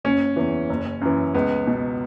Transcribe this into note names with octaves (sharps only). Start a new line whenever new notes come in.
F#1 C#4
E2 E3
F#1
F#2 E3
C#2 B3
B2